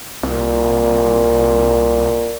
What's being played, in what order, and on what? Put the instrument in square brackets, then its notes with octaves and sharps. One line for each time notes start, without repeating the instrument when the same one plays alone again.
[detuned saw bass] C2 [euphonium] A#2